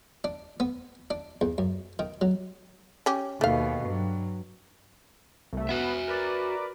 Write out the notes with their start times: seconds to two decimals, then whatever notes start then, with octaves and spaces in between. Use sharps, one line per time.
0.24 D4
0.60 B3
1.10 D4
1.41 E2
1.58 F#2
1.99 D#3
2.21 F#3
3.06 C#4 G4
3.41 D#2 B2 A3 F5
3.85 G2 F#3
5.53 C2 A3
5.69 B3 F#4 B4 E5
6.08 A#4 B4 D5